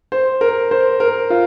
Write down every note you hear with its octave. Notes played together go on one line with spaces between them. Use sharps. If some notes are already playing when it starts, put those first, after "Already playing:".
C5
A#4
C5
A#4
F4